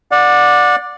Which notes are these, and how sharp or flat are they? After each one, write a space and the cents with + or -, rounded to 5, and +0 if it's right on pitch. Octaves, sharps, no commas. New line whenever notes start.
D5 +10 F#5 -30